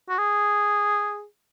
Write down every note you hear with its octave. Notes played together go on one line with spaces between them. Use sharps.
F#4
G#4